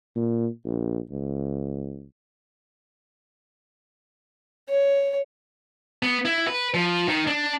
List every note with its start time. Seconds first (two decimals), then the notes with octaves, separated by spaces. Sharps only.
0.16 A#2
0.65 A#1
1.11 C#2
4.69 C#5
6.03 B3
6.25 E4
6.47 B4
6.74 F3
7.08 D#3
7.27 D4